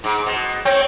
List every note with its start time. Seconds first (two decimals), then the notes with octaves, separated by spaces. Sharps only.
0.04 G#2
0.26 B2
0.65 C4 C#5 G5